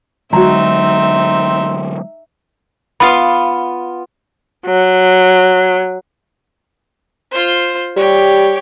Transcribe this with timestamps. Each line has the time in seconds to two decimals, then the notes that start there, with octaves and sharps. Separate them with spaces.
0.33 D3 F#3 G#3 C4 D#4 F#4 E5 A#5
3.00 B3 F4 F5 B5
4.67 F#3
7.31 F4 C5
7.96 G3 G4 C#5